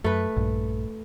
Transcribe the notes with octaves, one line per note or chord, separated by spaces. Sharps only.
F#2 A3 B4
A#1 G2